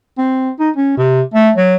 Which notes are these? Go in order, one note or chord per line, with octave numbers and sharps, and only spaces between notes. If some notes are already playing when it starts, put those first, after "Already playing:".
C4
D#4
C#4
C3
A3
F#3